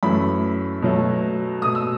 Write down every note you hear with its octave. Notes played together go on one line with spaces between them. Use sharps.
F#2 E3 A3 B5
B2 F#3 A3
B2 A3 D#6
E6